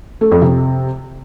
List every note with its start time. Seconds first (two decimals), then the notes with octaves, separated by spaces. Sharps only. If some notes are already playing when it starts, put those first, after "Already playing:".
0.21 A3
0.31 F2
0.42 C3